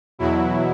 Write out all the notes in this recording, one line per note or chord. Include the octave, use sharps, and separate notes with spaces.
E2 B2 F#3 E4